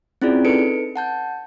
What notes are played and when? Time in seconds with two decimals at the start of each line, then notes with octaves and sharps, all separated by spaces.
0.22 C4 C#4 E4 F4 G#4 D5
0.45 D#4 A4 B4 C#7 D7
0.96 F#5 A5 G6